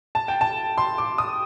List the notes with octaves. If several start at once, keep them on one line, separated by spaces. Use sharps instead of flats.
A5
G5
A5
C6
D6
D#6